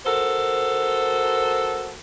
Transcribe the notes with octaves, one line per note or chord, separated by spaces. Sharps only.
F#4 A4 A#4 C5